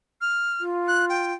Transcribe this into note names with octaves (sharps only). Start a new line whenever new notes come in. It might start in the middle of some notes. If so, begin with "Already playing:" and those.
F6
F4
F#6
G5